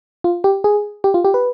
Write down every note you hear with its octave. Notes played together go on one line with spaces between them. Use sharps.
F4
G4
G#4
G4
F4
G4
B4